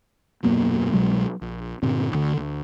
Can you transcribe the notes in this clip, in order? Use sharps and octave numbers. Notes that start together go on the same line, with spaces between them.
D#1 F#2 B2 A#3
C2 B2 F#3 G#3
A#1
G2 A#2 D3 C4
D2 D3
D2